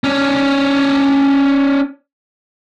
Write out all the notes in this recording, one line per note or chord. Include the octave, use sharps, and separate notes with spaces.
C#4 D4